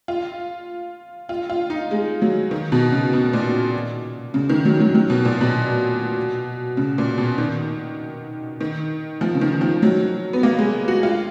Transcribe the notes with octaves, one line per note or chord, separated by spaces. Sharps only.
F4
F4
F4
D#4
G#3
F#3
D#3
B2
C#3
B2
A#2
C#3
D#3
F#3
F#3
F#3
B2
A#2
B2
C#3
A#2
B2
D#3
D#3
F3
C#3
D#3
F3
F#3
B3
A#3
G#3
F#4
F4